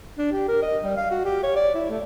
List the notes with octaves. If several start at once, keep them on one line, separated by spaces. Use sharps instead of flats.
D4
G4
A#4
D#5
G3
F5
F#4
G4
C#5
D5
E4
A3